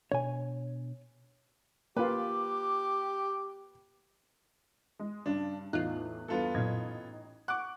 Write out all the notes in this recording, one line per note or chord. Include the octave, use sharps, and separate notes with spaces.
B2 D4 C#5 G#5
A#3 F4 G4 B4 D6
G#3
G2 C#3 D4
E2 A2 E3 D#4 F4 F#6
E2 G2 B3 F4 A4
A1 F#2 A#2 D#4 G#6
F#5 C#6 D6 F#6